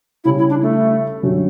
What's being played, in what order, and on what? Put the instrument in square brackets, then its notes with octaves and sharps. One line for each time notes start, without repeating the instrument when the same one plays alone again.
[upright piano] C#3 G3 C#4 [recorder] E4
[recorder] E4
D4
A3
[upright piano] F#2 D3 G3 C#4 F#4